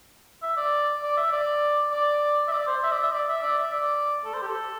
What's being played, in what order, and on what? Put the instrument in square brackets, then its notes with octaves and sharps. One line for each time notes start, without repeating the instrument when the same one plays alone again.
[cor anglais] E5
D5
D5
E5
D5
D5
E5
D5
C5
E5
D5
E5
D5
E5
D5
E5
D5
A4
C5
G4
A4